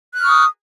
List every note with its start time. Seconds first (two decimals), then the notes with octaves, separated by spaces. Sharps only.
0.14 F#6
0.19 F6
0.24 C#6
0.28 D#6